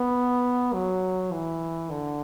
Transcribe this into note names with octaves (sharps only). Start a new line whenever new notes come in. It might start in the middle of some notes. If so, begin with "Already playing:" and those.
Already playing: B3
F#3
E3
D3